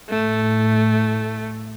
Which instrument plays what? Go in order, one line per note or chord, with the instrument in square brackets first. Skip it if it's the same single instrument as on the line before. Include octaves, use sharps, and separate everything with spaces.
[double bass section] A2 [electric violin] A3